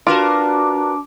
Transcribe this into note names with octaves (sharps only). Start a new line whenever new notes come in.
D4 F4 F#4 A#4 B4 D6